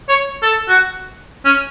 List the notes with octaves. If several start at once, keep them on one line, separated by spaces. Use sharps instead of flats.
C#5
A4
F#4
C#4